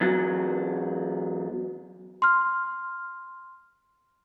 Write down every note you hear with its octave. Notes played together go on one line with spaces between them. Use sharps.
E2 F#3
C6 F6